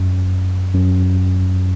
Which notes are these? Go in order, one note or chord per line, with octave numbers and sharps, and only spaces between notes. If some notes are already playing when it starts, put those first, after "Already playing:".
Already playing: F#2
F#2